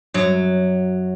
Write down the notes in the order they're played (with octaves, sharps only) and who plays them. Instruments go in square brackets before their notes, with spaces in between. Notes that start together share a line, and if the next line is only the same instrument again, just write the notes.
[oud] F#2 F#3